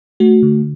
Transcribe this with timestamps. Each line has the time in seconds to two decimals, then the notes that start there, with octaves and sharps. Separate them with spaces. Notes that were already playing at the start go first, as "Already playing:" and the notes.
0.20 A3 F#4
0.43 D3